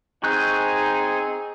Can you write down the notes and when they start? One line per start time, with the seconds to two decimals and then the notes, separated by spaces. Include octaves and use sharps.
0.24 C4 D#4 G#4 G#5 C#6 F#6 G6